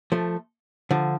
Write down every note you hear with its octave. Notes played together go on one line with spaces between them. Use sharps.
F3 A3
D3 F3